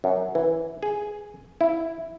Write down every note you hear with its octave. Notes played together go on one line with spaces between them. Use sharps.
F#2
E3
G#4
E4